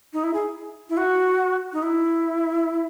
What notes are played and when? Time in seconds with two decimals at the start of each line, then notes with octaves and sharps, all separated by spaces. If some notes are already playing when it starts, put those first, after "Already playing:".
0.13 D#4
0.23 E4
0.34 G#4
0.89 E4
0.97 F#4
1.73 D#4
1.83 E4